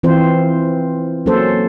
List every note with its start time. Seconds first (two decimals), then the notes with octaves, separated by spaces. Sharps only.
0.03 E3 C4 F4 C5
1.26 F#3 A#3 C#4 A4 C5